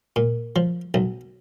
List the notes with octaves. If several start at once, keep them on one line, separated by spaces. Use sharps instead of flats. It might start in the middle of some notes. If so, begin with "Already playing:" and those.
A#2
F3
B1